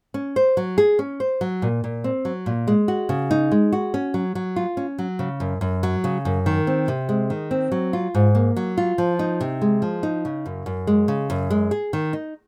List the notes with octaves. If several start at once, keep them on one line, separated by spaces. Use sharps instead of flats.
C#4
C5
F#3
G#4
C#4
C5
F#3
A#2
A#2
C4
F#3
A#2
G#3
F#4
C#3
D#4
G#3
F#4
C#4
F#3
F#3
F4
C#4
F#3
C#3
F#2
F#2
F#3
C#3
F#2
D#3
C4
C3
G#3
D#3
C4
F#3
F4
G#2
A#3
F#3
F4
F3
D#4
C3
G#3
F3
D#4
C#3
F#2
F#2
G#3
C#3
F#2
G#3
G#4
D#3
D#4